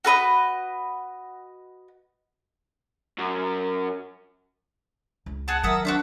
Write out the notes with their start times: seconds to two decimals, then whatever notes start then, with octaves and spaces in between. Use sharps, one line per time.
0.05 F#4 A4 B4 D#5
3.19 F#2
5.26 C#2
5.48 G#4 F#5 A5
5.63 D#3 F#3 A#4 E5 F#5 A5 D#6
5.85 D4 F#4 C5 E5 A5